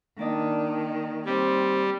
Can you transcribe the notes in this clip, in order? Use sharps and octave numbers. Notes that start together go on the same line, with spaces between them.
D#3 A#3 D4 D5 D#5
G3 C4 C#5 D5